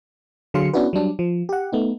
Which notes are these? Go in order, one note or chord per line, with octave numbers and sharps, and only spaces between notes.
D3 F#3 G#4 F5 C6 C#7
B3 C#4 D4 E4 F#4 B4
F#3 G3 D4
F3
G4 F#5
A3 B3 D#4